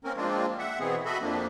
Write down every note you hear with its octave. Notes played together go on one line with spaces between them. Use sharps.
A#3 C4 C#4 A#4
F3 G#3 A#3 C4 D4 F4
E5 F#5
B2 E3 B3 C4 G#4
F#4 A4 D#5 E5 B5
F2 F3 A#3 D4